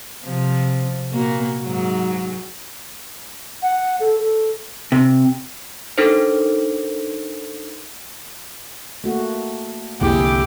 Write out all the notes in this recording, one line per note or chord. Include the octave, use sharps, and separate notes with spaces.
C3 F3
A#2 A#3 F#4
G#2 F#3
F#5
A4
A4
C3
D4 D#4 A4 A#4 C5
A3 A#3 F#4
C2 F2 D3 A#3 E4 G4 G#4